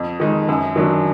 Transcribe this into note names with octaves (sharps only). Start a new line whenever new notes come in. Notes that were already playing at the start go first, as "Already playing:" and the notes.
Already playing: F2
D#3 G#3 D#4
F#2
D#3 F#3 D4